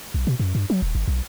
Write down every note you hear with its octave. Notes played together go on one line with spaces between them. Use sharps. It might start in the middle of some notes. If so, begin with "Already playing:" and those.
B1
B2
F#2
G2
F#3
D#1
G1
B1